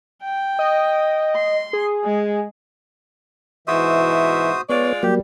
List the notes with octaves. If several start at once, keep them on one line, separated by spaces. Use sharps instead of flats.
G5
D#5
C6
G#4
G#3
G#2 B2 E3 F#4 C5 E5 D#6
G#3 B3 F4 C#5 D5
F#3 G3 A#3 G4